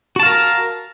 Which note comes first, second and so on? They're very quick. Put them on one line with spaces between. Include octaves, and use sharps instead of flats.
F#4 A5 F5 A#4